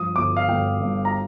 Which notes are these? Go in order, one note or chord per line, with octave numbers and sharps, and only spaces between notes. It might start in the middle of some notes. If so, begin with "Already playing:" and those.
Already playing: G2 F3 D#6
G1 D6
F5
G1 G5
G2
A#5